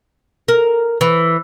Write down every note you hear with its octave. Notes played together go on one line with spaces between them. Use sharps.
A#4
E3